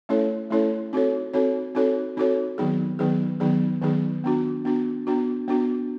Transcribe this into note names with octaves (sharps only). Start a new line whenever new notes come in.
A3 C#4 E4 A4 C#5
A3 C#4 E4 A4 C#5
C4 D#4 F#4 A4 C#5
C4 D#4 F#4 A4 C#5
C4 D#4 F#4 A4 C#5
C4 D#4 F#4 A4 C#5
D#3 F#3 B3 D#4 G#4
D#3 F#3 B3 D#4 G#4
D#3 F#3 B3 D#4 G#4
D#3 F#3 B3 D#4 G#4
B3 D4 F#4
B3 D4 F#4
B3 D4 F#4
B3 D4 F#4